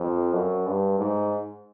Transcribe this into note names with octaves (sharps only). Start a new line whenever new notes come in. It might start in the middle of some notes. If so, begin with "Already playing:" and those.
Already playing: F2 C5
F#2
G2
G#2